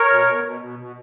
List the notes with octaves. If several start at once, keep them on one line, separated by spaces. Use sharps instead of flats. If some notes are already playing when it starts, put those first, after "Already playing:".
Already playing: A#4 C#5
B2
B2
B2
B2
B2